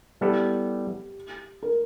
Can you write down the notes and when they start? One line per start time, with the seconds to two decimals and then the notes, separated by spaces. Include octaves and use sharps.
0.21 G3 B3 E4 G4 A4
1.63 A#4